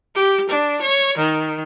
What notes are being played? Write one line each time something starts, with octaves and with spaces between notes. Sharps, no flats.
G4
D4
C#5
D#3